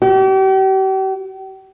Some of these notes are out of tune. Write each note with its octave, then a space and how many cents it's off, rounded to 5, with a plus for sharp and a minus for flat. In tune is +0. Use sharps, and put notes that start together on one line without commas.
G4 -40